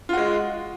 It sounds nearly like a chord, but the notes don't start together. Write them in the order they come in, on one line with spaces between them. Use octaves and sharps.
F4 F#4 G#3